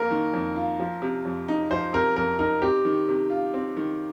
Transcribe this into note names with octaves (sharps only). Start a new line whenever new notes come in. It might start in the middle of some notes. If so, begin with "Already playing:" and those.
Already playing: F2 A#3 A#4
D#3
F2
F4
F3
C3
F2
D#4
F3 C5
C3 A#4
F2 A#4
D#4 A#4
C4 G4
D#3
C3
F4
C4
D#3